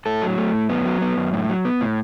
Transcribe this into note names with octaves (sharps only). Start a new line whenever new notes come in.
A2 A4
F#3
A3
A2
F#2 B3
F#3
B3
F#2
A2
F#3
B3
A2